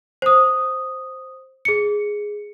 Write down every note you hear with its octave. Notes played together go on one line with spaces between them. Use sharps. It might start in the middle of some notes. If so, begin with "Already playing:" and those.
C5 D#6
G#4 C#7